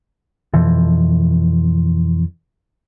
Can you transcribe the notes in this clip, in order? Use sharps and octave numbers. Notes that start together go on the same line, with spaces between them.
F2 B2 E3 F3